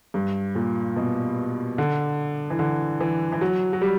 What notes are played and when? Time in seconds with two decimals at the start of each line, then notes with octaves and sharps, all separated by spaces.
0.14 G2
0.55 A#2
0.96 B2
1.78 D3
2.50 E3
2.59 D3
3.00 E3
3.32 E3
3.41 F#3
3.73 F#3
3.82 G3